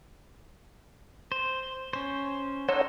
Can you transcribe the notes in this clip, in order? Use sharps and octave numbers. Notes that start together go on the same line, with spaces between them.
C5
C#4 C5
D#4 A4 C5 C#5 F#5